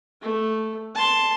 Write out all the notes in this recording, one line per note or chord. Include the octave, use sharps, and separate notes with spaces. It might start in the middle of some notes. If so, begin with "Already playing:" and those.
A3
A5 C6